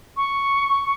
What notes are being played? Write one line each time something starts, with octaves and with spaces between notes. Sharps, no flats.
C#6